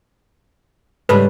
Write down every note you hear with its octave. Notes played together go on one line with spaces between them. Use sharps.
G#2 C#3 G3 A4 B4